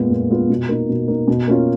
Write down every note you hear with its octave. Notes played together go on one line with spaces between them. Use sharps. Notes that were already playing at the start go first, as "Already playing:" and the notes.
Already playing: A#2 G#3 B3 F4
A#2
G#3 B3 F4
B2
A#3 D#4
B2
A#3 D#4
B2
A#3 C#4 F4